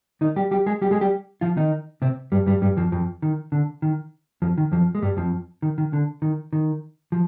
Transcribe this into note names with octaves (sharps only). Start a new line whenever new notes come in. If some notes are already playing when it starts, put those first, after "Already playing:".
D#3 D#4
G3 G4
G3 G4
G#3 G#4
G3 G4
G#3 G#4
G3 G4
F3 F4
D#3 D#4
C3 C4
G2 G3
G2 G3
G2 G3
F2 F3
F2 F3
D#3
D3
D#3
F2 F3
D#3
F2 F3
G#3
G2 G3
F2 F3
D#3
D#3
D3
D#3
D#3
F3